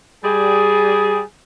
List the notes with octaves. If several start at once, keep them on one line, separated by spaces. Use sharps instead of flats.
G3 G#4